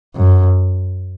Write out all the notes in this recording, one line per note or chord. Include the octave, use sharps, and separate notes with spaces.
F#2